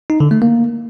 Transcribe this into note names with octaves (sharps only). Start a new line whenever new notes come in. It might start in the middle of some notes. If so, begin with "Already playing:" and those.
D#4
D3
A3
A#3